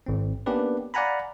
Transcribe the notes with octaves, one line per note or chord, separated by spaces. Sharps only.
G#1 C4
A#3 B3 C#4 D4 G4 B4
D5 F5 F#5 G#5 A#5 B5